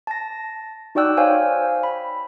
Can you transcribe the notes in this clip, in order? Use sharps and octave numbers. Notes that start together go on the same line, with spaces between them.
A5 A#6
D#4 F#4 D5 G5 E6 F#6
C5 C#5 F5 G5 G#5
B5